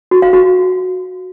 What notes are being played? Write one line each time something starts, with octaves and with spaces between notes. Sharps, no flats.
F#4
F5
F#4